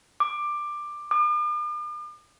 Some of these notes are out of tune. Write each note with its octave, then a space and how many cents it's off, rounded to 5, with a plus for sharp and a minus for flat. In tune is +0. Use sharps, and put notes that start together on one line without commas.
D6 +15
D6 +45